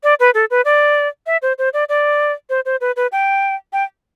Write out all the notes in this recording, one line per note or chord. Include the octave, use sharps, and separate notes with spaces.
D5
B4
A4
B4
D5
E5
C5
C5
D5
D5
C5
C5
B4
B4
G5
G5